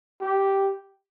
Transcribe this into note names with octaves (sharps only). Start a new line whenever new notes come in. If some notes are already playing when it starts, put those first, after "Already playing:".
G4